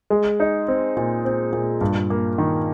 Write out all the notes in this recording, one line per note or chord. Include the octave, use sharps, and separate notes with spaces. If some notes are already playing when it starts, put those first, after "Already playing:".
G#3
D#4
C4
A#2
C4
A#2
G2
A#3
D#3